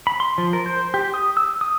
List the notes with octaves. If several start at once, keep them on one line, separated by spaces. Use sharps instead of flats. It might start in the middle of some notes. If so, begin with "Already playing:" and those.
B5
C6
F3
A#4
C5
G4
D#6
E6
D#6